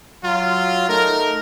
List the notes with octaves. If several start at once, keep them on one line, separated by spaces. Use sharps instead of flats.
F#3 F4
A3 D#4 A#4